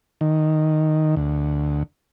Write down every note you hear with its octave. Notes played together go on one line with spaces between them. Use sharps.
D#3
D2